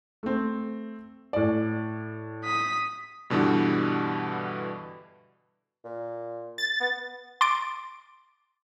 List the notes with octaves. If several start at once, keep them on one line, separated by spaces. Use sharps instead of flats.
A3 C4
A2 D5
D#6 B6
G2 B2 D3 E3 G3
A#2
A6
B3
C6 D6 A6 D7